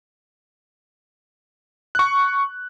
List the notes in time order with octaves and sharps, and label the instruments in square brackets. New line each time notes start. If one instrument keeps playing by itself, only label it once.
[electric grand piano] C#6 F#6